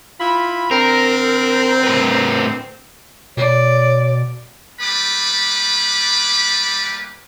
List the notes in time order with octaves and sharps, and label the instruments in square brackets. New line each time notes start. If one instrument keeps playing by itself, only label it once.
[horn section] E4 F4 B5
[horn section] D3 C4 [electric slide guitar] A#4
[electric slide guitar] A2 A#4 B4
[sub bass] B2 [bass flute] C#5 [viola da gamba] D5
[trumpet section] G3 A3 A#3 B4 B5 D6